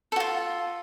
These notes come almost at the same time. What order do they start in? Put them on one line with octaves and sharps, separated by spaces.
A4 F#4 F4